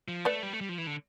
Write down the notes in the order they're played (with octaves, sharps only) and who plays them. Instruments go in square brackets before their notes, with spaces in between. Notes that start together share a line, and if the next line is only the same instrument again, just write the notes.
[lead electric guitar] F3
[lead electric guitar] A3 [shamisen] B4 D5
[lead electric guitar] G3
A3
G3
F3
E3
D3